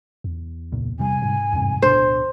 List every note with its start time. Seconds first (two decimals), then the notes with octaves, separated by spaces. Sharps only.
0.24 E2
0.72 C#2 A#2
0.99 C3 G3 G#5
1.22 G#2
1.53 E2 G2 C3
1.82 D1 B2 D4 C5